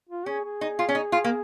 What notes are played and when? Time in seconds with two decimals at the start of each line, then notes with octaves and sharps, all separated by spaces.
0.09 F4
0.26 C#4 G#4
0.45 G#4
0.61 D#4
0.79 F4
0.89 C#4
0.95 D#4
1.12 F4
1.24 A#3